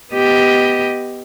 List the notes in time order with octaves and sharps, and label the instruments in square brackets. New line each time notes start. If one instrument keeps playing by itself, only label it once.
[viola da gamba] B3 G4 D#5